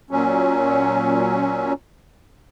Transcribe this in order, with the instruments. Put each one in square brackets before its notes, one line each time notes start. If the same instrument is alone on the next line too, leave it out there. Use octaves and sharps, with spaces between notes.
[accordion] A#2 F#3 C#4